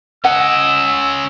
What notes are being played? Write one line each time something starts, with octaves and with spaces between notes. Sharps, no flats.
C#4 D#5 F#5 E6